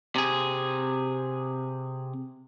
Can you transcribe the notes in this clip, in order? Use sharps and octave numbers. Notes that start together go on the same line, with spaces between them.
C3 G#4